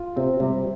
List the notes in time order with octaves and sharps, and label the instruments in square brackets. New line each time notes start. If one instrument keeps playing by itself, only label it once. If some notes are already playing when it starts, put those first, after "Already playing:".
Already playing: [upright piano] F4
[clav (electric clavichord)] C3 [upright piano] C4
[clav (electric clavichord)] C3 [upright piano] G3